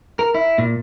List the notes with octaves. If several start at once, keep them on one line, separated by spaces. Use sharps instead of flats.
A#4
E4
A#2